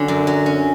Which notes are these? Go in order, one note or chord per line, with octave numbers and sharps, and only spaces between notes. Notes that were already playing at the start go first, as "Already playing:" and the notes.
Already playing: D3 F#3 C#4
F#2
F#3
C#4